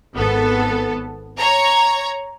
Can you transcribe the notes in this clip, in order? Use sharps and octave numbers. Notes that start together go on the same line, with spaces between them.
G#1 B3 A4
C#5 A#5